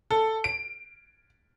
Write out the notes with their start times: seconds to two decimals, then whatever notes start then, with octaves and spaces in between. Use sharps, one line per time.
0.11 A4
0.44 D7